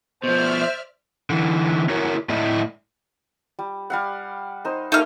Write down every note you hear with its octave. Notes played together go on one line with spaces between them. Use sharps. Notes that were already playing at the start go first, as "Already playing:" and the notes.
B2 F3 C5 D5 E5 F6
D3 E3
E4 F#4 A#4 C#5
A2 A3 E4 D5 D#5
G3
G3 F5 F#5
D#4 C5
A3 A#3 D#4 G4 F6